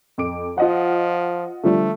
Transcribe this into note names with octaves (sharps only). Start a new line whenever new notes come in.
F2 D6 D7
F3 F4 D#5 F#5
D3 F3 G3 A3